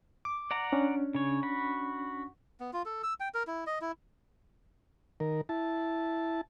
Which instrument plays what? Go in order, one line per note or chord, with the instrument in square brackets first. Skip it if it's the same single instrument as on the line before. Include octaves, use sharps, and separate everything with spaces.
[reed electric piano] D6
[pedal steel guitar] D5 F#5 A#5
[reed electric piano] C#4 D4
[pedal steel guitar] C#3 C#5
F#4 B5
[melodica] B3
F4
A4
E6
G5
A#4
E4
D#5
E4
[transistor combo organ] D#3 A#4
E4 A5